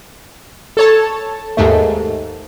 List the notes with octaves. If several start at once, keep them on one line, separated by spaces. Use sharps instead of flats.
A4 C#5 A5
D#2 G#2 A3